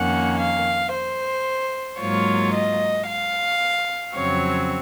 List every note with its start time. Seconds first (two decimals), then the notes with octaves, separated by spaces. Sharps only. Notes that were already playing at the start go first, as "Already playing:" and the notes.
Already playing: F2 D#3 A#3 C#4 F#5
0.39 F5
0.94 C5
2.01 G#2 F#3 A#3 F4 C#5
2.55 D#5
3.08 F5
4.16 F2 C#3 F#3 C4 C#5